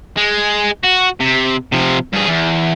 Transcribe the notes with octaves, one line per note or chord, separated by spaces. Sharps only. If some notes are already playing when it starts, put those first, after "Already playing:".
G#3
F#4
C3
C3 F3
G2 G#4
E2